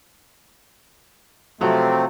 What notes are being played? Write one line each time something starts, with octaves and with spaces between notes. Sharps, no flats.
C3 F3 F#3 A3 C4